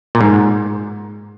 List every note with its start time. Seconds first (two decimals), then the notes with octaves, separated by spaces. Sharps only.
0.15 A#2
0.21 G#2